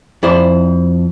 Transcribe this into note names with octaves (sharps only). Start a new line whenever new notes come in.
F2 E4 C5 D5